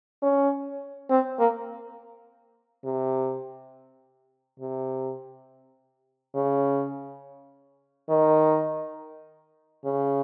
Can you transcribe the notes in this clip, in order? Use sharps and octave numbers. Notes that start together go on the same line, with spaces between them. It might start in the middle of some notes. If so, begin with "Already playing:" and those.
C#4
C4
A#3
C3
C3
C#3
D#3
C#3